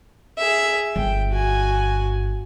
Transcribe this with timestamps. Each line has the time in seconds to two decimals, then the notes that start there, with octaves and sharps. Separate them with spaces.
0.38 G#4 E5
0.96 G1 G5
1.30 F#4 G#5